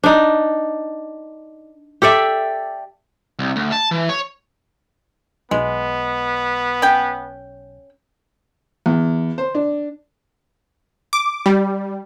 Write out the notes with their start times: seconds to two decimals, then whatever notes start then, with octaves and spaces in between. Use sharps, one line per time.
0.04 D4 D#4
2.02 G4 A4 D5 E5
3.39 C2
3.56 D2
3.72 A5
3.91 E3
4.09 C#5
5.51 B1 G#3 B3
6.82 C#4 G5
8.86 E2
9.38 C5
9.55 D4
11.13 D6
11.46 G3